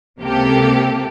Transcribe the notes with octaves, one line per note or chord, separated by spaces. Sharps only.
C#2 C3 A#3 G4 A4